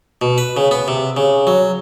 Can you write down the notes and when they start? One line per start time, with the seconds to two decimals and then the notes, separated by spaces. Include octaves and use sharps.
0.22 B2
0.38 B4
0.57 C#3
0.71 B3
0.88 C3
1.17 C#3
1.47 F#3